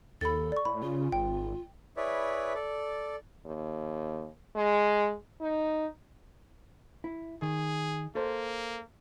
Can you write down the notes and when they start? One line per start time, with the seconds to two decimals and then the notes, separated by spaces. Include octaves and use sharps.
0.21 D#2 A4 B5 A6
0.52 D5 C#6
0.65 A2 B5
0.82 C#3 F4
1.12 G#1 G5
1.97 E4 G#4 B4 C#5 D5 E5
2.55 A4 D5
3.45 D#2
4.56 G#3
5.41 D#4
7.04 E4
7.42 D#3 G#4
8.15 A#3 A4 C5